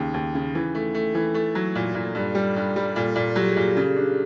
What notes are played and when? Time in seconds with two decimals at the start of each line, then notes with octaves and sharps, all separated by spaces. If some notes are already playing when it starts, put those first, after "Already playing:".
Already playing: D#2 C#3 D#4
0.14 D#2
0.35 C#3
0.55 E3
0.75 A3
0.95 A3
1.15 E3
1.34 A3 A4
1.55 F#3
1.75 A#2
1.95 A#2
2.15 G2
2.35 G3
2.56 G2
2.76 G3
2.96 A#2 A4
3.16 A#2
3.35 F#3 G4
3.49 G#4
3.57 A#2
3.62 G4
3.76 C#3 G4
3.96 D4